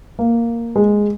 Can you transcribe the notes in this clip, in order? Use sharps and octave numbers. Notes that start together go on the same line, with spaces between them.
A#3
G#3